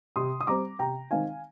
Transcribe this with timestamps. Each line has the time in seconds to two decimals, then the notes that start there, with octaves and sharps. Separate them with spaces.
0.16 C3 C6 D#6
0.41 D#6
0.47 G3 C4 A#5 D6
0.79 C3 G5 A#5
1.11 D#3 G#3 C4 D#4 F5 G#5